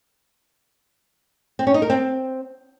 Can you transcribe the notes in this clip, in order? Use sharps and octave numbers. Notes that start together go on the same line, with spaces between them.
C4
C#4
D#4
A#4
C4